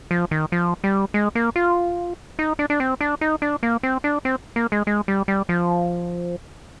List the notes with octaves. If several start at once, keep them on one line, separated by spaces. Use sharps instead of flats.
F3
D#3
F3
G3
G#3
A#3
F4
D#4
D4
D4
C4
D4
D#4
D4
A#3
C4
D4
C4
A#3
G#3
G#3
G3
G3
F3